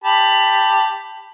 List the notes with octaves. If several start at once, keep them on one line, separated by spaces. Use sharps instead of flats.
G4 A5 B5